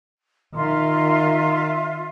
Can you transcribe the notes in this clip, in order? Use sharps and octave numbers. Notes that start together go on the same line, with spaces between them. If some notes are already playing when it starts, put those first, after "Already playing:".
D#3 F4 E5 C6